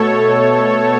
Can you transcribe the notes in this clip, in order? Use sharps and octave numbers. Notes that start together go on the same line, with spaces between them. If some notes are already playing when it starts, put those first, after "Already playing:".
Already playing: B2 A3 A4 C#5